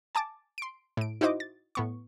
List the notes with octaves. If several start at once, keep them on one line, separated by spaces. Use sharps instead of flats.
G#5 A5 D6 A6
C6 D7
A2 D7
D#4 E4 F#4 C5 D#5 D6
A6
A2 B3 C#6